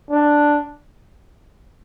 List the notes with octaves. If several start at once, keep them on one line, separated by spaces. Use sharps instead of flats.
D4